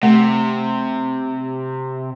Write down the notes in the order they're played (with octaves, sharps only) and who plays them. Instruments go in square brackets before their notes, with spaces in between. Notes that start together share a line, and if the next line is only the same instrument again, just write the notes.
[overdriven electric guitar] C3 [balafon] A3